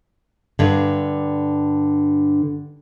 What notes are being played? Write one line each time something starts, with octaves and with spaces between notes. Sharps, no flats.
G2 D3